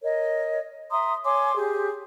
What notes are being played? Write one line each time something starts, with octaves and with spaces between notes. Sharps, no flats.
A#4 C#5 D#5
E5 A#5 C6 D#6
C#5 G#5 C6 D6
G4 G#4